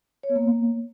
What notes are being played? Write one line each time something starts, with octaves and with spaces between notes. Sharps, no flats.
C#5
B3
A#3